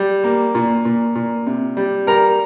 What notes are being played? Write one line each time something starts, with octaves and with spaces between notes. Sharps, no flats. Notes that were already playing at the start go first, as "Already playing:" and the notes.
Already playing: G3
A#3
A#2
A#2
A#2
C3
G3
G3 A#4 A#5